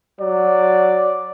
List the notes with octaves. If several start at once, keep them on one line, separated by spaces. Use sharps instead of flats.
F#3 D5